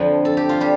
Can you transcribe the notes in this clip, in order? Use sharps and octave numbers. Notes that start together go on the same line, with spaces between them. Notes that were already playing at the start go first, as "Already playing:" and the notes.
Already playing: F2 D3 F3
A4
G4
F4
G3 G4